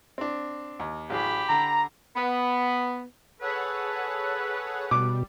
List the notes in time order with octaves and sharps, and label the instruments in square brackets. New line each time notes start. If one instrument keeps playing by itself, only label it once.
[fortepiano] C4 D4
D#2
[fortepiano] A1 F#3 G#4 [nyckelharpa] G4 B5
[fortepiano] D3 [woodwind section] A#5
[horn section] B3
[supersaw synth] G#4 C#5 F#5 [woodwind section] A4 B4
[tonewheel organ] B2 [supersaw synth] G3 [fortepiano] D6